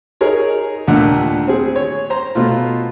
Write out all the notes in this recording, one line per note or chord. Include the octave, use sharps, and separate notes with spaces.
D#4 G#4 A#4 C#5
D#2 A#2 D3 A3 F#5
C4 G#4
C#5
C5 A#5
B2 A3 F4